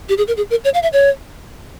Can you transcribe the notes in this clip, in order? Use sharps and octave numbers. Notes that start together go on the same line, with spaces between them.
G4
G#4
A#4
G#4
A#4
C#5
F5
E5
C#5